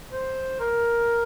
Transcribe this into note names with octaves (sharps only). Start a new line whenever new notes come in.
C5
A#4